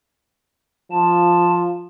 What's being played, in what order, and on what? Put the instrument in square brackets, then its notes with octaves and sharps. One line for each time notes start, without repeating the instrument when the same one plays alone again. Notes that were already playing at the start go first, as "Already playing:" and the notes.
[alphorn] F3 [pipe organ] A5